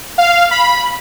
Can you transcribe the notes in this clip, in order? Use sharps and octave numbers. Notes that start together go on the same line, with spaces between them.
F5
B5